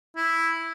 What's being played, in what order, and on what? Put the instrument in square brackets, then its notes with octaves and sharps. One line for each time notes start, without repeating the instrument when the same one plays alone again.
[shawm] E4